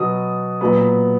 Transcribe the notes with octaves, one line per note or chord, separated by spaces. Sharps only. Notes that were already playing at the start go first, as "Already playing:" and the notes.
Already playing: B2 F#3 B3 D#6
A#2 F#3 B3